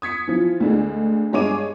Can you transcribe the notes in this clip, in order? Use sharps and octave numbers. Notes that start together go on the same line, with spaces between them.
D#6 G#6 B6 C#7
E3 F3
D2 D3 G#3
G2 G#3 G#4 C#5 D6 D#7